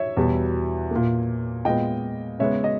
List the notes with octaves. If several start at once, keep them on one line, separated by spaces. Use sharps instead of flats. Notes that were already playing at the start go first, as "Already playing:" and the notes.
Already playing: C#5 E5
E2 B2 G3
A#2 A#3
A#2 G#3 B3 D#5 G5
C#3 G#3 B3 C#5 E5
D#5